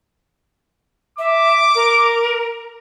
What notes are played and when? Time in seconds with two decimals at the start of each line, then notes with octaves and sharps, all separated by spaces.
1.19 E5 D6
1.75 A#4